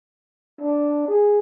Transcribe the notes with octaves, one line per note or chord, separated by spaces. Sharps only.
D4
G#4